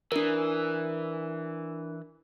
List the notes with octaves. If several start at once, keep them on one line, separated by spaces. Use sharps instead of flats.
E3 D4 A#4